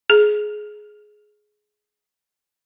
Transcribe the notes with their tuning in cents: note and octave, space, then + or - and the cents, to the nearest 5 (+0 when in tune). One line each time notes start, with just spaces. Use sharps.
G#4 +15